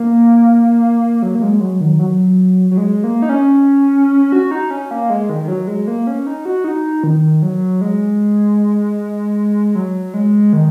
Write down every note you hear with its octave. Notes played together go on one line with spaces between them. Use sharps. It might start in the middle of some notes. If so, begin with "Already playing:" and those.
Already playing: A#3
F#3
A#3
G#3
F#3
D#3
F#3
F#3
G#3
A#3
D#4
C#4
F#4
D#4
C#4
A#3
G#3
D#3
D#3
F#3
G#3
A#3
C#4
D#4
F#4
D#4
D#3
F#3
G#3
F#3
G#3
D#3